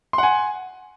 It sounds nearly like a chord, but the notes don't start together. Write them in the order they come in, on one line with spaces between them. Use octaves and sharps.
C6 F#5 G#5